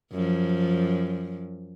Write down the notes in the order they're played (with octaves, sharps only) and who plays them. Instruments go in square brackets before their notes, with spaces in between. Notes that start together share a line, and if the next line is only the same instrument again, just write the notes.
[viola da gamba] F#2 F3